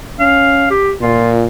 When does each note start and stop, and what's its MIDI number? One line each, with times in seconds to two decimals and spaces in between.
0.19 0.72 61
0.19 0.66 77
0.70 0.92 67
1.01 1.48 46
1.01 1.31 65